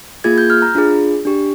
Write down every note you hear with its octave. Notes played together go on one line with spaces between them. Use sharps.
A#3 F4 G#4 G#6
G6
F6
A#5
D4 F4 G#4
D4 G4